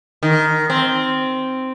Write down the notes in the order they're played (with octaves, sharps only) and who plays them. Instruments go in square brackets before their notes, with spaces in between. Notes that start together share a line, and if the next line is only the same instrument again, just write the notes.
[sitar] D#3
C4